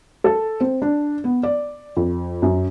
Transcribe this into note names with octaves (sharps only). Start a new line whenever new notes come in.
A4
C4
D4
B3
D5
F2
F#2